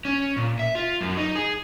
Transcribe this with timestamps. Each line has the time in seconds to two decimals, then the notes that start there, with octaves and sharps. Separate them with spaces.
0.05 C#4
0.36 A#2
0.59 E5
0.75 F4
1.01 F#2
1.17 D#4
1.36 G#4